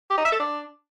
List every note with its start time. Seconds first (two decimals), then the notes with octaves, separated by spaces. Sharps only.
0.10 G4
0.18 D#4
0.25 E5
0.32 A4
0.40 D4